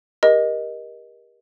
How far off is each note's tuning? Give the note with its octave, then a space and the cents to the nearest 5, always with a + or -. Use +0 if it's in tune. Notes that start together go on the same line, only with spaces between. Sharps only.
G4 +25 A#4 +30 D#5 +0